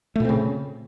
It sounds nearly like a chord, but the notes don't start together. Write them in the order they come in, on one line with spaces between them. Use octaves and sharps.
A3 A#2 C4 C#3